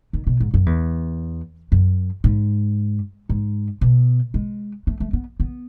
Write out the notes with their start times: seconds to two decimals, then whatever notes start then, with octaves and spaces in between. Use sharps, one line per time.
0.13 D#3
0.27 B2
0.40 G#2
0.54 F#2
0.66 E2
1.72 F#2
2.24 G#2
3.29 G#2
3.81 B2
4.34 G#3
4.87 A3
5.00 A3
5.13 B3
5.40 B3